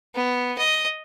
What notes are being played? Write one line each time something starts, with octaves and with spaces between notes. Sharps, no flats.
B3
D#5